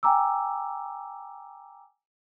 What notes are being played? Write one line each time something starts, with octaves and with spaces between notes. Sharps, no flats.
G5 G#5 A#5 D6 E6